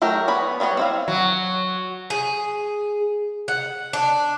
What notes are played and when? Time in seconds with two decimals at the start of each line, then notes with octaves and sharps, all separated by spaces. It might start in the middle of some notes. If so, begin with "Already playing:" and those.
0.02 F#3 A3 G4 A#4
0.28 B3 C#5 B5
0.60 F#3 G3 B3 C#5
0.77 C4 E4 F5
1.08 F#3
2.10 G#4
3.48 F#5
3.93 D4